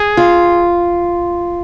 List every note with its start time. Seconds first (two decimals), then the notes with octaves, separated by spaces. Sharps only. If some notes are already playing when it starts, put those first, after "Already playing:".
Already playing: G#4
0.17 F4